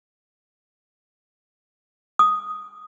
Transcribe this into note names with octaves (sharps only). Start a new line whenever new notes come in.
D#6